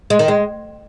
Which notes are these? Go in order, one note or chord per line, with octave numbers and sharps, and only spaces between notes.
G#3
D#3
G#3